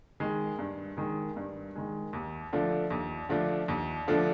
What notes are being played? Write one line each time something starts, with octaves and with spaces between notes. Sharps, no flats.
D#3 G#3
G2
D#3 G#3
G2
D#3 G#3
D#2
D3 F3 A3 D4
D#2
D3 F3 A3 D4
D#2
D3 F3 A3 D4